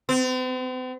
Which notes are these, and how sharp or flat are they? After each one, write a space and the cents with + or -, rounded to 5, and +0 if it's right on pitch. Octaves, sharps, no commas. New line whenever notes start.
C4 -45